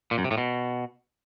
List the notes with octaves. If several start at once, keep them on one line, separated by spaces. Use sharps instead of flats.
A#2
F#2
C3
A2
B2